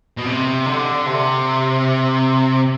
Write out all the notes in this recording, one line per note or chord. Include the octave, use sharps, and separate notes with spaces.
B2
C3
D3
C3